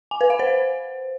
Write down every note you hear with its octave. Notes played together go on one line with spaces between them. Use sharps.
G#5
B4
F5
C5